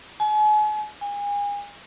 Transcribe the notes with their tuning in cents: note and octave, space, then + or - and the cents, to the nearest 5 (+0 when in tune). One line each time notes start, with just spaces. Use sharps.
G#5 +40
G#5 -35